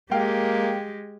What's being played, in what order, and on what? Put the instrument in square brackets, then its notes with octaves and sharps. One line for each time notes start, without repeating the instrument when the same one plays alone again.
[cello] G#3 G4 [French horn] A#3 [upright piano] F5 G5